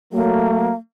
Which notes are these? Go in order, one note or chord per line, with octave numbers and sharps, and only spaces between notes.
F#3 A3 A#3